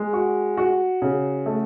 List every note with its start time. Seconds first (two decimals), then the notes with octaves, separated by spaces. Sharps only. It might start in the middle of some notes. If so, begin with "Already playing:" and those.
Already playing: G#3
0.13 F#4
0.57 F#4
1.02 C#3
1.46 A3